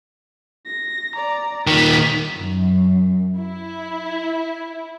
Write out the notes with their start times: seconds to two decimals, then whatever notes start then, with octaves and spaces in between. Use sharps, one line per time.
0.66 A#6
1.16 D5 A#5
1.67 A#2 D#3 B6
2.37 F#2
3.38 E4